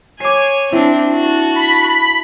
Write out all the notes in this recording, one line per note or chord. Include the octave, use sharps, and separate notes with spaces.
C#5 G#5 D6 C7
C4 D4 E4
F#4 A5
B5 B6